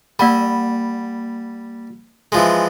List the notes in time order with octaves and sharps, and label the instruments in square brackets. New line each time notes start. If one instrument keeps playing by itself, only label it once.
[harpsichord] G3 [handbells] A#3 F#5 B5
[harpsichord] E3 F3 G#3